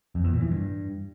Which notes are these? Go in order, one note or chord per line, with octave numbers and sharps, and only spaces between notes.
F2
E2
A#2
E3
G2